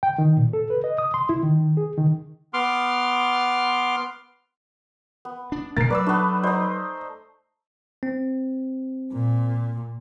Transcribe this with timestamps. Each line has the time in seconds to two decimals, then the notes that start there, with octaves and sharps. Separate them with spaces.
0.03 G5
0.18 D#3
0.37 A#2
0.53 A4
0.70 B4
0.84 D#5
0.98 D#6
1.14 C6
1.29 E4
1.43 D#3
1.77 G#4
1.98 D#3
2.54 B3 C6 D6 F6
5.25 B3
5.52 D4
5.77 A#2 A3 A#4 A6 C7
5.90 F#3 B4 D5 D6 E6
6.06 A3 B3 D4
6.43 D#4 C5 D5
8.03 C4
9.12 A#2